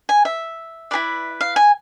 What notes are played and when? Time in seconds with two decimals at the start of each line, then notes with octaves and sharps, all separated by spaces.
0.09 G#5
0.25 E5
0.91 E4 G#4 B4 D5
1.41 F5
1.56 G#5